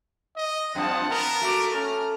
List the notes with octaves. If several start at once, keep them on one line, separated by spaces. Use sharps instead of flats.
D#5
F#2 F3 C4 F#5 A5
B3 A#4
A3 F#4 D6
C#4 A#5 F6